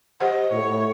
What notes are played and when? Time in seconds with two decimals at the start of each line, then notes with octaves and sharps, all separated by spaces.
0.21 G4 C5 D#5 F#5
0.52 A2 C#5